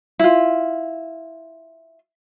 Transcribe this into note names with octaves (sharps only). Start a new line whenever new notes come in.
E4 F4